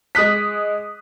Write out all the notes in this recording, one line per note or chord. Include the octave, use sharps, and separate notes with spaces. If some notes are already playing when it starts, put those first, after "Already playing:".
G#3 D#6 F#6 B6